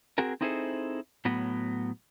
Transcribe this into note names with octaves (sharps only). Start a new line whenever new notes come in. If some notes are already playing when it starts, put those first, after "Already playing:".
C4 F#4 G#4 A#4
C4 D#4 E4 G#4 A4 C5
A2 F#3 B3